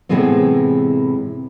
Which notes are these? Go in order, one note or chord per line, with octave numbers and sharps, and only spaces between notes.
A2 C3 E3 G#3 B3 C4